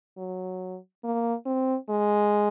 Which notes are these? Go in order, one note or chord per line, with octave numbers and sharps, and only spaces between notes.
F#3
A#3
C4
G#3